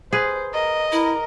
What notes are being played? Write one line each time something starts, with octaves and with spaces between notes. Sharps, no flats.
G#4 B4 C5
A#4 D#5
E4 A#4